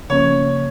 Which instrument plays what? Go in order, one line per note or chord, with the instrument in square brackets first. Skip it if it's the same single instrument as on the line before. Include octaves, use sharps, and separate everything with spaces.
[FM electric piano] C#3 F3 A#3 C#4 [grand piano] C#5